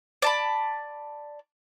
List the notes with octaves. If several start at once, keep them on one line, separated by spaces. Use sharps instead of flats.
D5 A5 B5